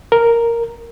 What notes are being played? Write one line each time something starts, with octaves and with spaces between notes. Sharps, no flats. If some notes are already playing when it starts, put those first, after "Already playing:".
A#4